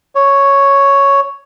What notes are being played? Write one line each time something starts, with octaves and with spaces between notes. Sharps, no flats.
C#5